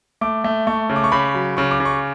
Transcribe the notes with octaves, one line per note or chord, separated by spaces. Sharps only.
A3 D6
A3
A3 C#6
C#3
D6
C#6
C#3 B5
F#3
C#3 C#6
D6
C#3
C#6